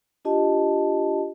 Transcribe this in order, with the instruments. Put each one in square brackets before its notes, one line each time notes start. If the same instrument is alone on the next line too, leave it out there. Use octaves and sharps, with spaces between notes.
[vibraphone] D4 F4 G4 D#5 A5